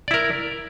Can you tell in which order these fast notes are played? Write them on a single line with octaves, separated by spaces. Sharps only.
D5 E4 A#4